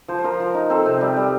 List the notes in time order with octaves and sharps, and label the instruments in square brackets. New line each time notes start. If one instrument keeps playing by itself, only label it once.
[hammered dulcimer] F3 C5
C5
F3 A#4
F3
D#4
C4 A4
C3
G3
G3